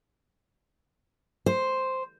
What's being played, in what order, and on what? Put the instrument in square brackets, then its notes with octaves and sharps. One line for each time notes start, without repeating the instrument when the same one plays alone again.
[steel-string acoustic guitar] C5